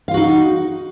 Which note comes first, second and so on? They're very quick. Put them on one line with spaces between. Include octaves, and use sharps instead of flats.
F5 F4 F#4 D#4